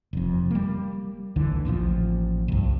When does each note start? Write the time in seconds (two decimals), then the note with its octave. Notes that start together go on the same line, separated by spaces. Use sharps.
0.13 F1 F2
0.51 G3 A#3
1.36 D2 D3 E3
1.65 A1 A#2 C#3 F3
2.48 C2 G2